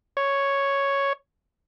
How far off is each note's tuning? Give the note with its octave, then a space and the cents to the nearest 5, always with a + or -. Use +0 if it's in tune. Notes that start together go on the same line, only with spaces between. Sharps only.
C#5 +0